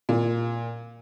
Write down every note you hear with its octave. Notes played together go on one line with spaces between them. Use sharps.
A#2